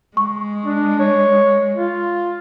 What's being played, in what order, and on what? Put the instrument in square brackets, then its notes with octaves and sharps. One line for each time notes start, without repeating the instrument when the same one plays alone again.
[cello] G#3 [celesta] C#6
[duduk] D4
C#5
F4